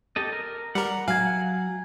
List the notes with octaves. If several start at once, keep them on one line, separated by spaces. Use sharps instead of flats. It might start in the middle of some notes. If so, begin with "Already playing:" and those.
G4 A4 D#5
A#4
G3 A#4 F#5
F#3 F5 G#5 G#6